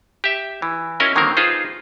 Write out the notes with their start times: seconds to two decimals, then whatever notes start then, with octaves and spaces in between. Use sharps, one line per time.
0.24 G4 E5
0.62 E3
1.00 C#4 E4 F#4 A#4 D#5
1.16 D3 D#3 F#3 A#3 C4 A#4
1.37 D#4 F4 G#4 B4 C5